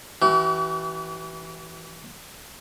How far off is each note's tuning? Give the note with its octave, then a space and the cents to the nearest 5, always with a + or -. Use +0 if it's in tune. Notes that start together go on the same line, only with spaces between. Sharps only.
E3 -10 F#4 +45